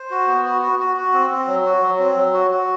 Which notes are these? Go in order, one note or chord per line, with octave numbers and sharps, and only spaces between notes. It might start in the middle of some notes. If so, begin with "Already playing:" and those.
Already playing: C5
F#4
B3
F#4
F#4
F#4
F#4
C4
C4
F#3
F#4
F#3
C4
F#3
F#4
F#4